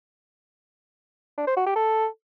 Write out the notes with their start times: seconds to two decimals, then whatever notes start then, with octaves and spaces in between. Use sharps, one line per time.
1.38 D4
1.47 C5
1.57 F#4
1.66 G4
1.76 A4